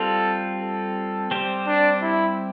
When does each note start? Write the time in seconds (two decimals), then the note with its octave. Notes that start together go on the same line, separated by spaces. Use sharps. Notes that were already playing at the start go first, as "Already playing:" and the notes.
Already playing: G3 C4 F4 A4
0.62 A4
1.31 G3 C4 G4 C5
1.67 D4
2.02 E4